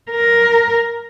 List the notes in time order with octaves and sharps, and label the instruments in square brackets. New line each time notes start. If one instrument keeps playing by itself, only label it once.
[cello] A#4